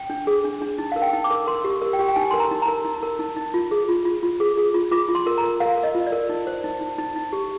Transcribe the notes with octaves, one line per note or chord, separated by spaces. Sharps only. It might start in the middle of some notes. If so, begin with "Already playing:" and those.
Already playing: G5
D4
G#4
D4
D4
D#4
A#4 F5
G5
D#4
D6
A#4
A#4 C6
G4
A#4
G5
G4
G5
D#4 G#5
A#4 C6
A#5
D#4
A#5
A#4
D#4
A#4
D#4
D#4
F4
G#4
F4
F4
F4
G#4
G#4
F4
F4 D6
F4
C6
A#4
A#5
A#4
A#4 F5
A#4
D#5
F4
D5
A#4
D#4
C5
D#4
D#4
D#4
D#4
G4